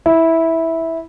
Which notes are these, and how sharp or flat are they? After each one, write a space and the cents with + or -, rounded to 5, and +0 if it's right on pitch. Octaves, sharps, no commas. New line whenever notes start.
E4 -10